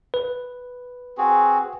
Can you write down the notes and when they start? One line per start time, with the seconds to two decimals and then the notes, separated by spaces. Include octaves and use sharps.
0.14 B4
1.18 C4 F#4 G#4